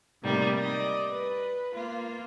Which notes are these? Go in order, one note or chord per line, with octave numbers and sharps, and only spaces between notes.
A2 C3 D#3 G3 A#3
D5 D#5
B4
A#3 F4